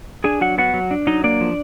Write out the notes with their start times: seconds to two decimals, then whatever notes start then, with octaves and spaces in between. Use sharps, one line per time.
0.24 D4 G#4 G#5
0.41 F#3 F#4 F#5
0.58 B3 F#4 F#5
0.74 F#3
0.91 D4
1.07 F#3 D#4 D#5
1.24 A#3 D4 D5
1.41 F3